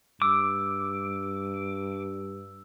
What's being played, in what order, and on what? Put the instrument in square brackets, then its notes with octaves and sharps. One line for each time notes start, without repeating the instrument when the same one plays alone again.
[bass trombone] G2 [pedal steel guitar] D6 [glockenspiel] E6